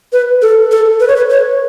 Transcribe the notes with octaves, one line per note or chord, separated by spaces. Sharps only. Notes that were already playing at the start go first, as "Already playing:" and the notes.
B4
A4
A4
B4
C#5
B4
C#5